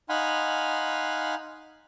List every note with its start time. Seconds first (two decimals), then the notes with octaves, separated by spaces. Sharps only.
0.09 D#4 F5 F#5 G#5 B5 C6